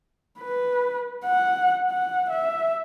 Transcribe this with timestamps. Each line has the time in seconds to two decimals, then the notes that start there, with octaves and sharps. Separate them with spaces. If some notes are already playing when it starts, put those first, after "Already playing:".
0.39 B4
1.25 F#5
1.90 F#5
2.29 E5